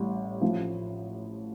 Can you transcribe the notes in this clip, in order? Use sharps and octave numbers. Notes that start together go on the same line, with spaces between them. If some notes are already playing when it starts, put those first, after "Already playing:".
Already playing: A1 A2 G3
A1 A2 F3